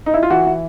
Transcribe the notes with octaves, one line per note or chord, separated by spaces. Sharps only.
D#4
E4
F4
E3 F#4
E3